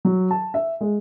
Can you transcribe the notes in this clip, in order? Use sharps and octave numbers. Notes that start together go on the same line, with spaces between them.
F#3
A5
E5
G#3